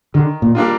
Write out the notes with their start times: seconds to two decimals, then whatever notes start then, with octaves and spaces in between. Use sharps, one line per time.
0.14 D3 D#3
0.42 A#2
0.55 G3 A#3 D4 F4